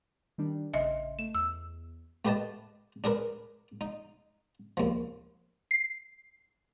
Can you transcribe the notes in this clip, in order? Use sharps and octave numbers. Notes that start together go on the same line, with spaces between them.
D#3 G3 D4
A1 C#3 D#5 E5 C6
A3 E7
E2 E6
A3 G4 B4 D#5 A5
D4 G#4 A#4 B4
D#4
D#2 F3
C7